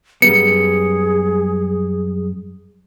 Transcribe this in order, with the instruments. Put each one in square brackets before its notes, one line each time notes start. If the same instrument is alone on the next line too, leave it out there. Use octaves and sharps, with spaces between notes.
[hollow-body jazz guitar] F#2 G3 B3 [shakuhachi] G#4 [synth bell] C#7